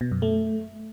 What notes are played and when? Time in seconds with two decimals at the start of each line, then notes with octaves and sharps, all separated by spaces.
0.01 B2
0.12 F#2
0.22 A3